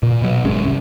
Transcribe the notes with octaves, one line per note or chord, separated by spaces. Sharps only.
A#2
B2 F#3
G#1 F#2 G#3 C#4
C2